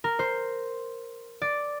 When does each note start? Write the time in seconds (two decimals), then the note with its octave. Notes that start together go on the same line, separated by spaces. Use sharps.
0.04 A#4
0.19 C5
1.42 D5